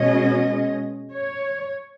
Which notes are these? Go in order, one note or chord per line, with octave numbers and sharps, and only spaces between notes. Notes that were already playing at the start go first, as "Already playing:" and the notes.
Already playing: B2 G#3 C#4 D#5
C#5